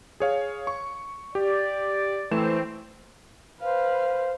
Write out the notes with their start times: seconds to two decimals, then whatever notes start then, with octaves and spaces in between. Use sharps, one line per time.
0.20 G#4 C#5 F5
0.67 C#6
1.35 G4 D5
2.31 E3 A3 C4 E7
3.61 B4 C5 F5